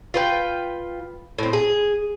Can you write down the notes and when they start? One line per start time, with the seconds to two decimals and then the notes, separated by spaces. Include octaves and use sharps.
0.14 F4 B4 G5
1.38 A2 C4
1.53 G#4